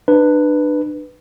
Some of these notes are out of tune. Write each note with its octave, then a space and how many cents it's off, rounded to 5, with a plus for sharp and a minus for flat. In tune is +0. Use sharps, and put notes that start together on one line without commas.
D4 +30 B4 +0